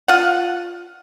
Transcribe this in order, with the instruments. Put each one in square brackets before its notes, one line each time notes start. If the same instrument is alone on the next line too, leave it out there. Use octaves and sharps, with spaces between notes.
[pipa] F4 F#5